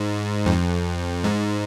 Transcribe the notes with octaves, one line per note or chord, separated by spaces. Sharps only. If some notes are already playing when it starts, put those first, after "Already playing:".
Already playing: G#2
F2
G#2